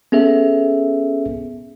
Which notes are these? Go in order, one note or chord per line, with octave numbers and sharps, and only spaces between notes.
B3 C#4 G#4 A4 E5